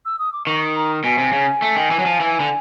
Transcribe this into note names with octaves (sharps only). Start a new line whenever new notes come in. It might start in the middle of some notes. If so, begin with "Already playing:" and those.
E6
D#6
D6
D#3 C#6
A#5
B2 G#5
C3
C#3
A3
D#3
E3
F#3
F3
E3
D3